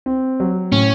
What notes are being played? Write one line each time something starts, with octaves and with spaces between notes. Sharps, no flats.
C4
F#3
A2 C#4